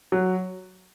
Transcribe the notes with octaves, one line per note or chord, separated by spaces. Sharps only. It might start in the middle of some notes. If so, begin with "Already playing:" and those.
F#3